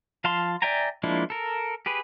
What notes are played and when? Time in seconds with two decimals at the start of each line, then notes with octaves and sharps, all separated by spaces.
0.24 F3 F5 A5 C6
0.62 D5 E5 G5 G#5 A#5
1.03 F3 G#3 A#3 D4 E4
1.30 A4 A#4
1.86 G4 G#4 B4